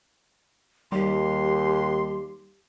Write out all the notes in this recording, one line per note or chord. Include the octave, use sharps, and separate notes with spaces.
D#2 G3 G4 C6